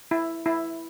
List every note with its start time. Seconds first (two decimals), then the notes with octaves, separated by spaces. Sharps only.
0.11 E4
0.46 E4